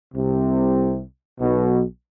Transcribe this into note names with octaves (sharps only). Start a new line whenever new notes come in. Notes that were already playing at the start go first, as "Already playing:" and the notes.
C2 C3
B1 B2